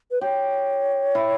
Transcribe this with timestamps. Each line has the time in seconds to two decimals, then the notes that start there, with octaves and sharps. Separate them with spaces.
0.11 B4
0.21 G4 C#5
1.15 E4